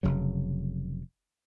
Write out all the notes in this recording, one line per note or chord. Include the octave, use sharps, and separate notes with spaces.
F1 C#3 F#3